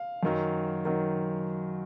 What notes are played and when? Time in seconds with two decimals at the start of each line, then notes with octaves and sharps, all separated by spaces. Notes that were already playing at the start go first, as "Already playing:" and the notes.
Already playing: F5
0.23 F#2 D#3 F#3
0.85 D#3 F#3